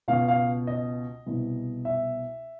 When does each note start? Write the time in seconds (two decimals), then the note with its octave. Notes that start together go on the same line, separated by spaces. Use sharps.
0.08 C#2 B2 F5
0.28 F5
0.67 D#5
1.26 C2 B2
1.85 E5